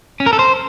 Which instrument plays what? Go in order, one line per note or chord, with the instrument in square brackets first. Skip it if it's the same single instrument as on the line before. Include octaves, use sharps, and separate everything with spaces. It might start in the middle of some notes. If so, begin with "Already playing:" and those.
[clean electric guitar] C#4
A#4
A4
C5